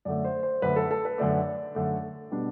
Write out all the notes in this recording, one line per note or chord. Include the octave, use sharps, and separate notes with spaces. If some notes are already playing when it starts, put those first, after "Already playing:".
F#2 D3 A3 D5
C5
C5
F#2 D3 A3 B4
A4
A4
B4
F#2 D3 A3 D5
F#2 D3 A3
B2 G3 D4